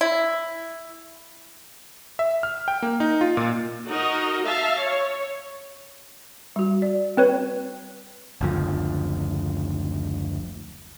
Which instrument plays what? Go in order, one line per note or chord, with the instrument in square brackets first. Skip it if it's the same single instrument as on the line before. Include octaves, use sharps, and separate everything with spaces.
[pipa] E4
[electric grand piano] E5
F6
G5
A#3
D#4
F4
A#2
[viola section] D#4 F#4 A#4 D#5
E5 F5 A5
C#5
[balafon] G3 F#4
D5
[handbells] C4 B4 C#5
[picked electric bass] F#1 D2 F3